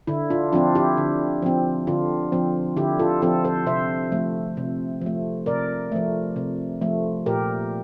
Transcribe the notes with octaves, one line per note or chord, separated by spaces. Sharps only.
D3 E4
D4 F4
F3 C4 D4 F4
E4 G4
D3
F3 C4
D3 D4 F4
F3 C4
D3 E4 G4
F4 A4
F3 C4 F4 A4
A4 C5
C3 C5 E5
F3 A3
C3
F3 A3
C3 A#4 D5
F3 A3
C3
F3 A3
A#2 G4 A#4